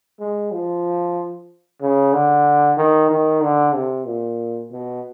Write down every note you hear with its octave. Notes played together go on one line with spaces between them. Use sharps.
G#3
F3
C#3
D3
D#3
D#3
D3
C3
A#2
B2